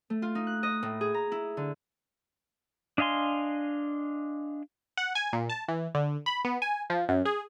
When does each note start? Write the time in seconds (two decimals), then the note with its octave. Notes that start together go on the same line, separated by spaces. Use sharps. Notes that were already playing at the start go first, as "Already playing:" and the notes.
0.10 A3
0.22 F4
0.35 D#4
0.47 F#6
0.63 D#5
0.83 A2
1.01 G#4
1.14 A#5
1.32 E4
1.57 D3
2.98 D4 D#5 F5 G#5 C6
4.97 F#5
5.15 G#5
5.33 A#2
5.49 A5
5.68 E3
5.95 D3
6.26 B5
6.45 B3
6.62 G#5
6.90 F3
7.09 F#2
7.25 G#4